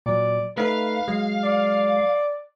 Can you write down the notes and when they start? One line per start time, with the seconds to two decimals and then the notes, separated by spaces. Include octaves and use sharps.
0.06 A#2 F#3 D5
0.58 A3 D#4 B4 F5
1.08 F#3 G#3
1.43 D5